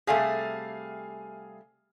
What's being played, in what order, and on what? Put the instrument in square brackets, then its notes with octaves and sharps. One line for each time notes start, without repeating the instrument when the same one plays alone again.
[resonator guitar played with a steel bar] C3 G3 A3 [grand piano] G#4 F5 G#5